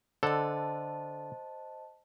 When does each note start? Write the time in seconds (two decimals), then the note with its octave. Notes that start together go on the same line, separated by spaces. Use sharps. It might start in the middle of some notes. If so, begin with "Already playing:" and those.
0.23 D3 A4 C5 D#5 A5